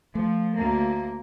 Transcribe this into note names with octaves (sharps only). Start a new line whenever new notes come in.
F3 A3
D2 A#3